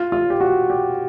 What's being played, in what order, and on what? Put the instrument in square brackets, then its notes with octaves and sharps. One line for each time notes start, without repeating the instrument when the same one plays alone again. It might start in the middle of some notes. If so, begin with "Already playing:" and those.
Already playing: [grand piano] F4
F4
G4
F#4
G4